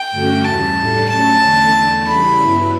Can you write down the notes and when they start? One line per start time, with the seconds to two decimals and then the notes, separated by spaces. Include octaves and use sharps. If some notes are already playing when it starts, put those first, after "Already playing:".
Already playing: G5
0.11 G2 D3 A3 C#4 F#4
0.44 E2 C#3 G3 A5
0.77 A2 G3 D4 A4
1.09 F#3 A3 C#4 A5
1.42 E2 D3 A3 D4
1.75 E2 D3 A3 D4
2.07 C#3 E3 G3 B5
2.39 G2 F#3 B3 E4